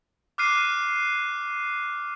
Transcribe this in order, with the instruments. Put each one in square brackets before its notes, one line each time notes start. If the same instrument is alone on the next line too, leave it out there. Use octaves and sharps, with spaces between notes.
[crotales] D6 F6 F#6 C7 D#7